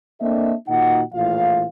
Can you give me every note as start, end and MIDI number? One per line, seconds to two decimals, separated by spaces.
0.21 0.53 58
0.21 0.53 60
0.21 0.53 62
0.21 0.53 69
0.21 0.53 75
0.21 0.53 76
0.68 1.01 46
0.68 1.01 51
0.68 1.01 63
0.68 1.01 66
0.68 1.01 78
1.14 1.66 34
1.14 1.66 45
1.14 1.66 52
1.14 1.66 53
1.14 1.66 65
1.14 1.66 77